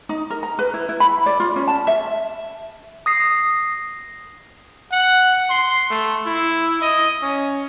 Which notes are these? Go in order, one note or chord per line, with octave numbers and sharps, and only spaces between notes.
D#4
A#4
A#5
B4
E4
E4
B5
D5
F4
C#4
A5
E5
D#6 A#6 C7
F#5
C6
A3
E4
D#5
C#4